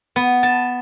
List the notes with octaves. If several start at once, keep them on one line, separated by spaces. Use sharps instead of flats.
B3
A5